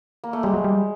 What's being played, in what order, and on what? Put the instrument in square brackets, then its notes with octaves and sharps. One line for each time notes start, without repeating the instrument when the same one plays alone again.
[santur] A#3
A3
[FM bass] G3 [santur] G#3
[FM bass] F#3
G3